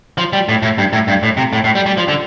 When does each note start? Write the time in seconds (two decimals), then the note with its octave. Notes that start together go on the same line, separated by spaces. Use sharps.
0.18 F3
0.33 G3
0.49 A2
0.62 A2
0.78 G2
0.93 A2
1.08 G2
1.23 A2
1.37 C3
1.53 A2
1.64 A2
1.75 G3
1.86 G3
1.97 F3
2.08 D3